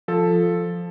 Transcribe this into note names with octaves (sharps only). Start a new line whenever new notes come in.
F3 A4
F3